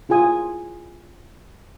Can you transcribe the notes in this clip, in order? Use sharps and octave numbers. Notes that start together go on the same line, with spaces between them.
E4 F4 G#4 G#5 D#6